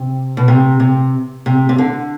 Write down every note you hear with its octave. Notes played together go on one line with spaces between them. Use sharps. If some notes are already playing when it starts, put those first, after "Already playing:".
Already playing: C3
B2
C3
C3
C3
C3
D3